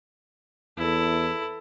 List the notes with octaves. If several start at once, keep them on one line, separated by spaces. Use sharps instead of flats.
E2 E4 A4